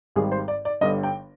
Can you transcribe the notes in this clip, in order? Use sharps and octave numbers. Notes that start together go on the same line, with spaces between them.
G#1 G#2 D#3 G3 G#4
C5
D5
D5
G1 G2 D3 G3 D#5
G5